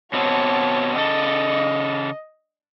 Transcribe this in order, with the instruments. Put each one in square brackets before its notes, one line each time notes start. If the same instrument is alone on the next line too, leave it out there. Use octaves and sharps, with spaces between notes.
[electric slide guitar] B2 B3 C4 [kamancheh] C#5 A5
[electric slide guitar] C#3 A4 [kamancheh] D#5